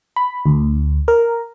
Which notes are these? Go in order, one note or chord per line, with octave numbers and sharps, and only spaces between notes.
B5
D2
A#4